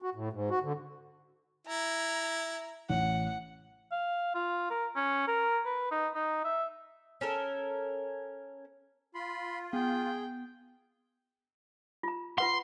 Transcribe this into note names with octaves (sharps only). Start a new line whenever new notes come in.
F#4
A2
G#2
F#4
D3
E4 A#5
A1 F#5
F5
F4
A#4
C#4
A#4
B4
D#4
D#4
E5
C#4 A4 A#4
F4 B5 C6
B3 G#4 G5
F4 A#5
F4 B4 F#5 C6